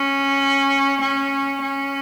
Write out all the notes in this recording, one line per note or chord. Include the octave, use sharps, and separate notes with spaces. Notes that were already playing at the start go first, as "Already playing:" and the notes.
Already playing: C#4
C#4
C#4